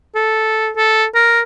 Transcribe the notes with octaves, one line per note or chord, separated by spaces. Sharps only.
A4
A4
A#4